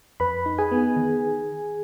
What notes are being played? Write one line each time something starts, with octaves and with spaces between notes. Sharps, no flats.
F2 B4 B5
D#4
G#4 G#5
B3
D#3